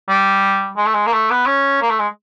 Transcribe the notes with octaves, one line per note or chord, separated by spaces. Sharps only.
G3
G#3
A3
G#3
A#3
A3
B3
C#4
A#3
A3
G#3